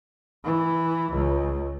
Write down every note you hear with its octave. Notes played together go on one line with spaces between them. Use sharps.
E3
C#2